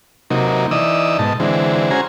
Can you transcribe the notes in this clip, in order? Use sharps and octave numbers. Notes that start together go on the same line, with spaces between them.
C3 F#3 A#3 D#4
E3 D#4 D5 D#6 E6
G#2 B2 D#5 A5
D3 E3 G#3 C4
C#4 F#4 G#4 C5 G#5 A#5